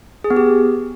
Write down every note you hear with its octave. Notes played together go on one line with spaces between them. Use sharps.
G#4
B3
G4